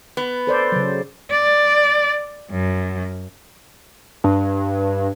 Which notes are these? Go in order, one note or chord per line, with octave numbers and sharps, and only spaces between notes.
B3
A4 C5 D5
C#3 F#3
D5
F#2
G2